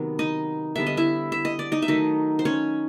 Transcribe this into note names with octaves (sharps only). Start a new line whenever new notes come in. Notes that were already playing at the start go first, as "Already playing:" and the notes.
Already playing: C3 D#3 F#3 B3
D#4 D#5
D3 G3 B3 E5
D#5
E4 E5
E5
D#5
D5
D#4 D#5
E5
D#3 F#3 A3 D#4 D#5
C5
C#4 C#5